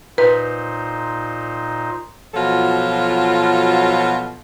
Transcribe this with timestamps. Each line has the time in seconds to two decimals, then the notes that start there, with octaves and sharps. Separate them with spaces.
0.18 A#2 D#4 B4 C5
2.35 B2 F3 F#3 F4 F#4 A4